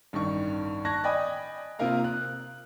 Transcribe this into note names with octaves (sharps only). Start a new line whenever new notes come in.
A1 G2 D#3 C#6
A5 C#6 F#6 G#6 A#6
D5 D#5 G5 G#5 B5 D#6
C3 A#3 F4 A#4 F5 A#5
F#6